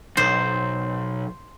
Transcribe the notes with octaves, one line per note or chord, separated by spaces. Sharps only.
B1 C5